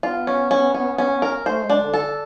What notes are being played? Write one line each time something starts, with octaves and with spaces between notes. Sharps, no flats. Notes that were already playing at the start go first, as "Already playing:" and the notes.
B3 F4
C#4
C#4
C#4
C#4
A#4
A3 C5
G#3
D4
D3
A4